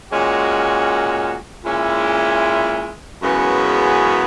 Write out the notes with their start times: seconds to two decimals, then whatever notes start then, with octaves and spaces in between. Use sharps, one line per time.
0.11 A#2 G#3 C#4 F#4
1.66 A#2 G#3 C#4 E4
3.21 F#2 C#3 E3 G#3 B3